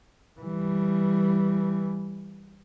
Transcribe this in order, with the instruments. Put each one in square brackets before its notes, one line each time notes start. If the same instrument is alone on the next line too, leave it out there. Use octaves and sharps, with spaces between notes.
[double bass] E3 G3